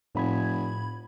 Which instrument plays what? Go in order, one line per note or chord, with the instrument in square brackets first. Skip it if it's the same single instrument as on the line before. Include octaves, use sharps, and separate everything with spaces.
[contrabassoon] F1 [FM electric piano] A2 B5 G#6